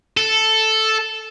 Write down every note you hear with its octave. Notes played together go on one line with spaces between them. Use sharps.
A4